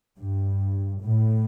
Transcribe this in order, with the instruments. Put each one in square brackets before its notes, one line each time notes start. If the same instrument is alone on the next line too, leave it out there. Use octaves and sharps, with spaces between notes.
[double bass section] G2
A2